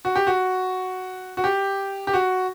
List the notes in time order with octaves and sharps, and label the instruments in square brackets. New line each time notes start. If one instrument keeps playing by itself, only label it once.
[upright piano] F#4
G4
F#4
F#4
G4
G4
F#4